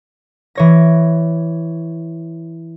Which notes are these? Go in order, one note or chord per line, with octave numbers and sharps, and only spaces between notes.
E3 C#5 A#6